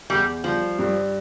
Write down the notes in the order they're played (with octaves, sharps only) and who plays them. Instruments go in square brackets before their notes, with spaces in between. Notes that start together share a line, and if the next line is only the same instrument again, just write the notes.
[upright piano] E2 [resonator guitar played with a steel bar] G3
[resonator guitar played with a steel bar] F3 [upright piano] G3
[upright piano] G2